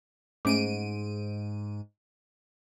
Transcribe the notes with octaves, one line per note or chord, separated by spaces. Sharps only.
G#2 A3 C#4 D6 D7 D#7